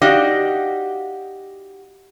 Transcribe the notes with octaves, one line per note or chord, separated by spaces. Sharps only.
D#4 F#4 G4 D5 D#5 F5